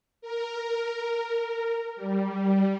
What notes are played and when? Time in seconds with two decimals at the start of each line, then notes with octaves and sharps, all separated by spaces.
0.22 A#4
1.96 G3